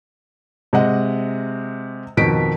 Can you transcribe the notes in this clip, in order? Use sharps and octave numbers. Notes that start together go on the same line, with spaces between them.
C3 G#3 D#5 F#5
F2 B2 D#3 B6 D7